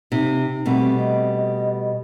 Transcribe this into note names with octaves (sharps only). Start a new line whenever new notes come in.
C3 D#4
B2 G3 A3 C4
D#5